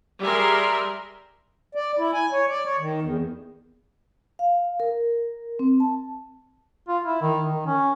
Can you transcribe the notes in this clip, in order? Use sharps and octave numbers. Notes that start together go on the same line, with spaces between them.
G3 G#4 A#4 E5 C6
D5
E4
G#5
C#5
D5
C#5
D#3
E2
F5
A#4
C4
A5
F4
E4
D#3
D#3
C#4